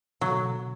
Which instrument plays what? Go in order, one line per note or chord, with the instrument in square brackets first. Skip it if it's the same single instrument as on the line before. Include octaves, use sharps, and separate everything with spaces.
[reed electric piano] B2 D3 [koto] F#3